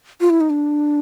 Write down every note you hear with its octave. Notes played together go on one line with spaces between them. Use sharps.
F4
E4
D#4
D4